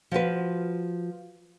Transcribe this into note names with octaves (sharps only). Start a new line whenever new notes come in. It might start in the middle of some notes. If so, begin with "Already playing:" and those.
F3 F4 F#4 B4